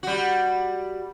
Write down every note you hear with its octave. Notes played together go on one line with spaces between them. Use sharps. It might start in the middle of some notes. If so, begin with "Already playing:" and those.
G3 F#4